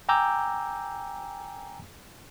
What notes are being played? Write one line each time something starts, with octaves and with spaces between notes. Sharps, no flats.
G5 G#5 A#5 D6 E6 G6